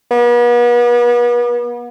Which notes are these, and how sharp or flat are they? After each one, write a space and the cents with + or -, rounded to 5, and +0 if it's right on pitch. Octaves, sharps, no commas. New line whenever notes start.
B3 -40